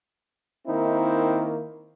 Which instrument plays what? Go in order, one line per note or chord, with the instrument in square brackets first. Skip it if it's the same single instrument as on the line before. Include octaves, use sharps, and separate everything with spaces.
[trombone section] D#3 A#3 C4 D#4 E4